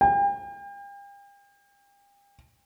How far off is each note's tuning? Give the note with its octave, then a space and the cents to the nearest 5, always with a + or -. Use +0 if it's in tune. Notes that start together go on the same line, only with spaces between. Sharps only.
G5 +40